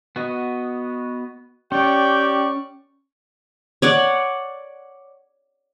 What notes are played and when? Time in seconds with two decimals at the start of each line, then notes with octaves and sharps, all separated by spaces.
0.16 B3 F#4 D#5
1.72 C#4 G4 D5 G5 C#6
3.82 C#5 D5 F#5